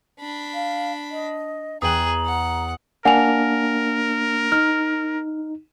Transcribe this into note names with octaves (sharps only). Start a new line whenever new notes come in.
D4 B5
F5
D#5
E2 G#4 G5 A#5 D#6 F#6 F#7
F#5
A#3 D4 A#4 F#5 G#5 F7
D#4 F6